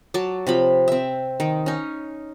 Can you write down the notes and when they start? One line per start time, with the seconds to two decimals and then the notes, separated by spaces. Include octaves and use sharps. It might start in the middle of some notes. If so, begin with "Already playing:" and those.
0.14 F#3 A5 D6
0.47 C3 F3 B5
0.88 C4 E5
1.40 D#3
1.66 C#4 D#4